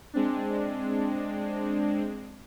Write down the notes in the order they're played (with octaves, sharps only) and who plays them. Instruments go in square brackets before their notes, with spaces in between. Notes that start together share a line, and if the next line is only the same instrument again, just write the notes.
[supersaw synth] G#3 C4 D4